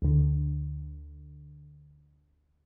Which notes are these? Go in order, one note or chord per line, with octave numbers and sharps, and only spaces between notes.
D2 D3